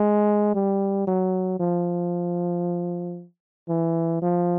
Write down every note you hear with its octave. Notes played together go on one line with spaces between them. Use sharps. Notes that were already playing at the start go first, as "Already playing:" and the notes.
Already playing: G#3
G3
F#3
F3
E3
F3